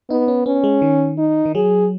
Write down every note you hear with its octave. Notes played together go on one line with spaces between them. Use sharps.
B3 D#4
C#4
B3 C#4
G#3
D#3
D#4
D#3
F#3 G#4